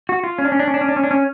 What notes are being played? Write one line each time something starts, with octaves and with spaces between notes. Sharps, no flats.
F#4
F4
C#4
D4
C#4
D4
C#4
D4
C#4
D4
C#4
D4
C#4